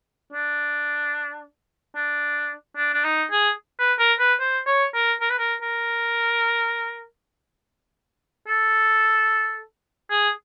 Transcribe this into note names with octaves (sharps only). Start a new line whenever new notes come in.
D4
D4
D4
D4
D#4
G#4
B4
A#4
B4
C5
C#5
A#4
A#4
B4
A#4
A#4
A4
G#4